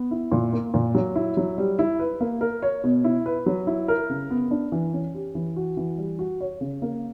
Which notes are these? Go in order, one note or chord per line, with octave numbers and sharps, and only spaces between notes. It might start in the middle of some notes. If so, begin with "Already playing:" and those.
Already playing: B3
E4
A#2
A#3
A#2
F#3
E4
F#3
G3
E4
B4
A#3
A#4
C#5
B2
E4
B4
F#3
E4
A#4
C#3
B3
D4
E3
C#4
G4
E3
F#4
E3
G3
F#4
C#5
C#3
A#3